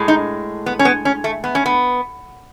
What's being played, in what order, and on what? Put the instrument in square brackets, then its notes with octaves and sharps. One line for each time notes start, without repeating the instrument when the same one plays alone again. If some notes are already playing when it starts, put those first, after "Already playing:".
Already playing: [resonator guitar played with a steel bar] A2 G#3
D#4
B3
C#4
B3
C#4
A3
B3
C#4
B3